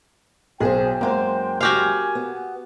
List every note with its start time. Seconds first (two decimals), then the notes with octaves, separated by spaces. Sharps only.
0.60 B1 G#4 A#4 C5 G5
1.01 F#2 G#3 A#3 C5
1.61 F#4 G4 F5 G#5
2.15 B3